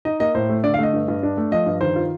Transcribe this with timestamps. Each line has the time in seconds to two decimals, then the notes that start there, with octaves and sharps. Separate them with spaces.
0.05 D#4 D#5
0.20 A#3 D#5
0.34 A2 C5
0.49 A3
0.64 D3 D5
0.74 F5
0.79 A3 D#5
0.93 G2
1.08 G2
1.23 D4
1.37 A3
1.52 F3 D#5
1.66 G2
1.81 D#3 C5
1.96 F4